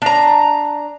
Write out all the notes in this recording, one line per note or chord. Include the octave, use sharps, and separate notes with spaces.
D4 A#5